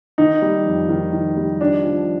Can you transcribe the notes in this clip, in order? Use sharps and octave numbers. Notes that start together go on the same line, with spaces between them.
D#3 D#4
G3
F2
D#3
D#3
G3
F3 D4
F3